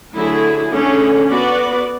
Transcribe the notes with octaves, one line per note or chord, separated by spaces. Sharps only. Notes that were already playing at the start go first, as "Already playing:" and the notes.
D3 F#3 A3 E4 G#4
D3 A3 C#4 G#4
B3 F#4 B4 D5